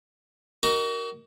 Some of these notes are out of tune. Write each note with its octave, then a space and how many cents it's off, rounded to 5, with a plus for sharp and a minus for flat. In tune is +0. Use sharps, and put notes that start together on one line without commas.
D#4 +0 F#4 +40 A#4 +0